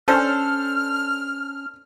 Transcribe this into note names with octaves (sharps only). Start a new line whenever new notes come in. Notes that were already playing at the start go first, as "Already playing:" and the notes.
C#4 D4 A4 C5 F6